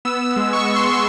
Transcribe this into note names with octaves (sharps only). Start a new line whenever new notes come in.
B3 E6
G#3
C#6
G#3
C6